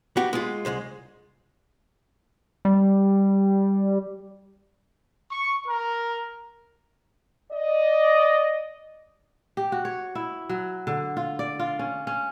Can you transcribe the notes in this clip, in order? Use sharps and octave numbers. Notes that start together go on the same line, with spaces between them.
B3 F#4 G4
G#3 F4
C2 G#3 C5
G3
C#6
A#4
D5 D#5
G4
F#4
C#5
E4
F#3
D3
F4
D5
F4
C#4
C#4